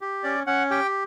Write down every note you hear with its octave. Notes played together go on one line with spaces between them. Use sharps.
G4
C#4 D5
C#4 F#5
G4 G5